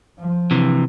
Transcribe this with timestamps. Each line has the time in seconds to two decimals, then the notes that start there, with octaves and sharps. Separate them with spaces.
0.19 F3
0.51 C3 E3